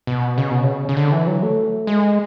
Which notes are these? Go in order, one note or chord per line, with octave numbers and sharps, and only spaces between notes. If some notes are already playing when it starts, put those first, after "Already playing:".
B2
C#3
B2
C#3
C#3
D3
E3
F#3
A3
G#3